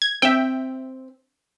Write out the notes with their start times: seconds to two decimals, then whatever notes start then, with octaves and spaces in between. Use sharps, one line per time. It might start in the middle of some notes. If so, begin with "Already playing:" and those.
0.02 G#6
0.22 C4 E5 G5